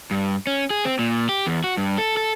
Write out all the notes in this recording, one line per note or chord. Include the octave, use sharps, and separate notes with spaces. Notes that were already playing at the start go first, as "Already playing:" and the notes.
G2
C#4
G#4
C4
A#2
G4
E2
F#4
G2
A4
A4